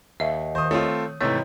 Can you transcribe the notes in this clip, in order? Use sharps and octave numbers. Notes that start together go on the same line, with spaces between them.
D#2 E5
D#3 C5 D#6
A3 C4 F4 C#5
G#2 C3 E3 A3 C#5